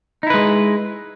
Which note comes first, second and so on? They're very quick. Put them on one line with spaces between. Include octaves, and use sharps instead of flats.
D#4 E4 B4 G#3